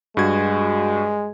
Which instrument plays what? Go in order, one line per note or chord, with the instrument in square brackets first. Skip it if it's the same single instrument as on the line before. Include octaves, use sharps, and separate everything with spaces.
[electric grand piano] G2 F#4 G#6 [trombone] G#3